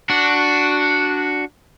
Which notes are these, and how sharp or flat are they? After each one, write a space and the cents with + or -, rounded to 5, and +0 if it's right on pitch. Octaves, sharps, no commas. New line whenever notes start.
D4 +0 F#4 +0